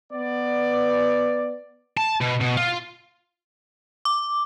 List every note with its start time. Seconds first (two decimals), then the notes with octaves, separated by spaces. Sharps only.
0.13 B3 D5
1.97 A5
2.21 B2
2.41 B2
2.57 F4
4.05 D6